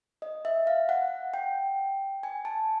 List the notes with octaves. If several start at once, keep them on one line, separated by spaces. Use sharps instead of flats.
D#5
E5
F5
F#5
G5
G#5
A5